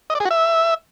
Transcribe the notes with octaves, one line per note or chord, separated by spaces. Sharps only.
D#5
D5
G#4
F#4
E5